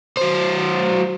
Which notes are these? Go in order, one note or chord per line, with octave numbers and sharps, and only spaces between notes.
F#3 C5